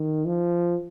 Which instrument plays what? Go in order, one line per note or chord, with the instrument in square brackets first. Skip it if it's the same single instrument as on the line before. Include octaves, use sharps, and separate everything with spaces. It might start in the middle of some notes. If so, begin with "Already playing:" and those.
Already playing: [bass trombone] D#3
F3